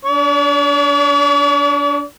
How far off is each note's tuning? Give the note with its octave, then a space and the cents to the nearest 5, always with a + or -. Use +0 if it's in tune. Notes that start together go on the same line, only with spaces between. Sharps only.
D4 -25 C#5 +45